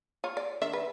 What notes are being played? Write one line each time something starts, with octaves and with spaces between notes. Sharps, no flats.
F4 C#5
D5
D#3 D4 E5
B4